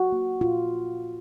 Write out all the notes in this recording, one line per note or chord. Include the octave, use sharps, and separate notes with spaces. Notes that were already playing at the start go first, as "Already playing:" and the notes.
Already playing: F#4
A#3
A#2 F4